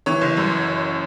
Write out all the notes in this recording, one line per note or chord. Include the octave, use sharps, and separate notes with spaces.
E3 C#5
F#1
F#2